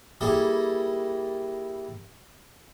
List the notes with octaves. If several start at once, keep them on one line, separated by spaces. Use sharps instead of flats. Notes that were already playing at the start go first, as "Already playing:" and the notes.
G3 A#3 E4 G#4 A4